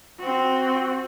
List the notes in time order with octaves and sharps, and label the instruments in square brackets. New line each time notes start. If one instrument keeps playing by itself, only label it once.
[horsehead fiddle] C4 F#4